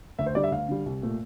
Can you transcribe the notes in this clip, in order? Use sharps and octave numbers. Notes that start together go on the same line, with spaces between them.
D2 E5
C5
D3 G3 D5
E5
D2 F5
D3 G3
C2
A#2 A3